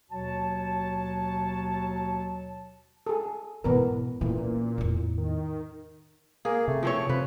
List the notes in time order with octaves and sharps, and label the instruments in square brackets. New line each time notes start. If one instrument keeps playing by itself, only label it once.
[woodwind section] D#2 B2 F#3 F#4 C#5 A5
[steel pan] G#4 A4
[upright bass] G#2 B2 [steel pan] E3 B3 A#4
[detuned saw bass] A#2 [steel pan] E3 [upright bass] C#4
[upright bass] E2 A2
[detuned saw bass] D#3
[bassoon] A#3 [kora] G#4
[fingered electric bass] C3 [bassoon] A3
[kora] F3 C4 C#5
[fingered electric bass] C3 [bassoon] F3 [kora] B4